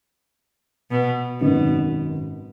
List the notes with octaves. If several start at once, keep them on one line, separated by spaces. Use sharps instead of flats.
B2
G#1 F#2 B2 D#3